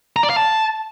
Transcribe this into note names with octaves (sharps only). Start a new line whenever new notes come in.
A#5
D5
F5
A5